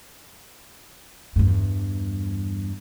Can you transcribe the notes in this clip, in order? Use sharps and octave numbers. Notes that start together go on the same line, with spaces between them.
E2 G2